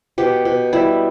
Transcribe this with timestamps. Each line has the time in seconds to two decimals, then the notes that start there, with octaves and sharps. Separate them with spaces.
0.18 B2 G4
0.45 B2
0.73 G3 E4